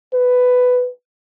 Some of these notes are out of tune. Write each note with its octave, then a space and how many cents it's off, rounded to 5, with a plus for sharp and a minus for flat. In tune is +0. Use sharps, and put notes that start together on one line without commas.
B4 +10